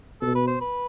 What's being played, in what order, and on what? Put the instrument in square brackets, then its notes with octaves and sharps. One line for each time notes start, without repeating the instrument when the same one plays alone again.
[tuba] B2 [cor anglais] A4
[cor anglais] B4
C5
B4